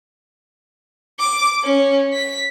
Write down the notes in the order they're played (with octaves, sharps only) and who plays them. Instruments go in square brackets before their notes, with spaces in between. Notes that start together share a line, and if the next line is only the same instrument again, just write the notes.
[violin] D6
C#4
B6